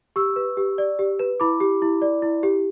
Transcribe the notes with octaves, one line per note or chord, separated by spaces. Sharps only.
G4 C#6 E6
B4
G4
D5
G4
B4
E4 B5 D6
G4
E4
D5
E4
G4